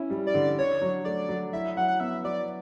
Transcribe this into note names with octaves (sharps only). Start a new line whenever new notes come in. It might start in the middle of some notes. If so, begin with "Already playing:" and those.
Already playing: C#4 E4
G3
D5
D3
D4 C#5
F#3
A3 D5
F#3
E4 E5
F#3 F#5
F#5
B3 E5
F#3 D5